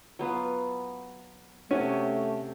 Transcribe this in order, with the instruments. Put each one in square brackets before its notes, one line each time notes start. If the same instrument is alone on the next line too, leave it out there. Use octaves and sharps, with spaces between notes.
[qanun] F#3 B3 F4
[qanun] C3 F#4 G#5 [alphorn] A3 [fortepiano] C#4